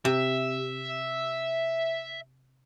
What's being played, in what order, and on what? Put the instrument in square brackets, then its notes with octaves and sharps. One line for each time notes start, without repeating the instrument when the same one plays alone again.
[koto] C3 [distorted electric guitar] E5